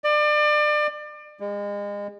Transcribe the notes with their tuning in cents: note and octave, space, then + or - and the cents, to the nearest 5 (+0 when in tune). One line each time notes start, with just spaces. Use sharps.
D5 +30
G#3 -35